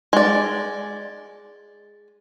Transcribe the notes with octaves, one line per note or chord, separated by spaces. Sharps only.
G#3 D5